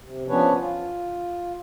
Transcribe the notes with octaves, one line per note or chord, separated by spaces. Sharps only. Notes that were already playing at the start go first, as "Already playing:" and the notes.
C3
F3 B3 C#4 D4 B4 C#5
F4